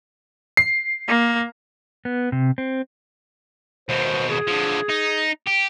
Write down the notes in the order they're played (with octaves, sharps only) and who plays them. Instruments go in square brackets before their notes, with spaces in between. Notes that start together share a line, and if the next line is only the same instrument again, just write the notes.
[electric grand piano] C7
[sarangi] A#3
[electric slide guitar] B3
C3
C4
[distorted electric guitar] D#2 B2 [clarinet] C5
[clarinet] G#4
[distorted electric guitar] D3 F3
D#4
G4